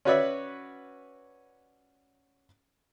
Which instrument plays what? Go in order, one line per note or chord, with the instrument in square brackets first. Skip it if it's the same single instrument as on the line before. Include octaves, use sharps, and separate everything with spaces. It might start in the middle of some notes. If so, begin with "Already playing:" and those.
[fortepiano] C#4 F#4 B4 C#5 D5 E5